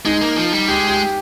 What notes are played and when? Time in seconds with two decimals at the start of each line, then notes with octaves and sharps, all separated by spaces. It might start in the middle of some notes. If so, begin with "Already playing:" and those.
0.05 G#3 D#4
0.21 A#3
0.36 F3
0.53 G3
0.68 G#3 G4
0.89 G4